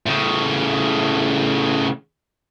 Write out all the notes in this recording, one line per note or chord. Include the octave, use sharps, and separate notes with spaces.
A2 C#3